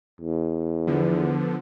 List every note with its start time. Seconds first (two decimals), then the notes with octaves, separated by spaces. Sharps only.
0.21 E2
0.87 D3 F3 B3